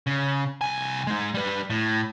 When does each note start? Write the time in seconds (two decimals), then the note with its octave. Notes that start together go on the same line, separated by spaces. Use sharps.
0.07 C#3
0.61 C2 G#5
1.07 G#3 D#4
1.34 G3 B4
1.70 A2